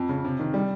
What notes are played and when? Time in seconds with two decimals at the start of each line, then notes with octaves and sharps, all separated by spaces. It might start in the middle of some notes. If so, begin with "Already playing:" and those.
Already playing: F2
0.09 C#3
0.24 C3
0.39 D#3
0.54 G3